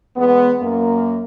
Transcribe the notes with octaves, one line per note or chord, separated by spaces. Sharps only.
E2 G#3 B3
F#2 A#3